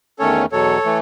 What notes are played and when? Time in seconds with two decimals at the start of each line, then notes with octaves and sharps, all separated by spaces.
0.19 E2 D#3 A3 C#4 A4 C#5
0.52 E2 B2 F#3 A4 C#5
0.85 E3 A3